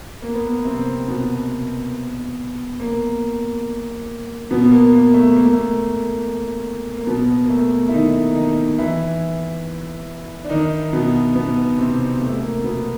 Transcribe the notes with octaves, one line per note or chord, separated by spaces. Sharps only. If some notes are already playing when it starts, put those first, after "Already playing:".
A#3
B3
A#3
C3 C4
B2 B3
A#3
B2 B3
A#3
A#3
A3
A#3
A3
A#3
A#3
B2 B3
A#3
A3
E4
D#3 D#4
D#3 D#4
E3 E4
D4
D#3 D#4
B2 B3
B2 B3
C3 C4
A3
A3
A#3
B2 B3